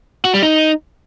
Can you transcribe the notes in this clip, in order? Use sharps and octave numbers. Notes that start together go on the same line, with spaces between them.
F#4
G3
D#4